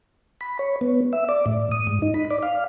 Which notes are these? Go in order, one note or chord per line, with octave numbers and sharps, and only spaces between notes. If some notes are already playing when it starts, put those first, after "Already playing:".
B5
C#5
B3
E5
D5
A2
D#6
G#2
D#4
B5
D5
F5